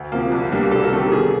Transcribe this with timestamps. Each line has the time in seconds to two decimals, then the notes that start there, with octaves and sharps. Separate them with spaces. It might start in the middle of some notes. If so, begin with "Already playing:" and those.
Already playing: D2
0.12 C3 F3 A#3
0.32 C2
0.52 B2 G3 A#3 D4
0.71 C2 A4
0.83 A#4
0.92 C3 D#3 G3 A4
1.12 B2 G#4